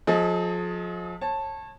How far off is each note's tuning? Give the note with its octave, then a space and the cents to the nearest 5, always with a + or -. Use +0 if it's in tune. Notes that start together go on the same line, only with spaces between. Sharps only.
F3 +30 G#4 +45 D#5 +15
C#5 -30 A5 +0